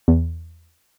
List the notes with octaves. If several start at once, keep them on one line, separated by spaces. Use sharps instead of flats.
E2